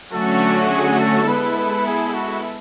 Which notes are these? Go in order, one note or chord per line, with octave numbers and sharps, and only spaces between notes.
D3 F#3 A3 C#4 F#4 A4
G#4
A4
G#3 B3 E4 A4 B4
B4
G#4
F#4